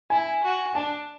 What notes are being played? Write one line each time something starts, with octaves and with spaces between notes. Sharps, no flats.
E4 G#5
F#4
D4 A5